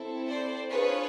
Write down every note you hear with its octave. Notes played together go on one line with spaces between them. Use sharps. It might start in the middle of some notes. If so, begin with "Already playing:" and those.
Already playing: C4 E4 A4
C5 D5
D4 F4 G#4 B4 C#5